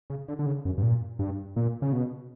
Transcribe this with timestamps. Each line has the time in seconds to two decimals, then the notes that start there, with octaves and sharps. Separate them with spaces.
0.10 C#3
0.28 D3
0.39 D3
0.46 C#3
0.65 F#2
0.78 G2
0.83 A#2
1.19 G2
1.56 A#2
1.82 C#3
1.93 B2